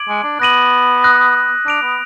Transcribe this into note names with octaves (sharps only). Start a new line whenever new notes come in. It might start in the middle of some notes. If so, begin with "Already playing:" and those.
Already playing: D6 G#6 D7 F#7
G#3
D4
B3 F#6 A#6 D#7 F#7
D#6 F#6 A#6
D4 F#6 D7 F7
B3